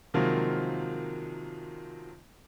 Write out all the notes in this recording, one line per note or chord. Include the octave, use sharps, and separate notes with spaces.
C3 D#3 F3 F#3 G#3 A#3